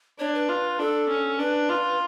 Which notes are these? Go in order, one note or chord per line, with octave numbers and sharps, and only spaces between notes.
D4 C#5
B4
F4
D4 A4
C#4
D4 B4
F4